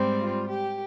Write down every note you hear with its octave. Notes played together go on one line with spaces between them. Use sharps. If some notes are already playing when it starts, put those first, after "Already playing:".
Already playing: G#2 G3 C4
F4
G4